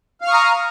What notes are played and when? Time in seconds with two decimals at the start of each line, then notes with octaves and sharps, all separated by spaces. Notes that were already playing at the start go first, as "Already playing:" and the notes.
0.21 F5
0.24 F6
0.27 C#6
0.30 D#6
0.33 A#5